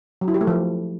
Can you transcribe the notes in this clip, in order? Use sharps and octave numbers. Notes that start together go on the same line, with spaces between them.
F#3
E4
G4
A3
F3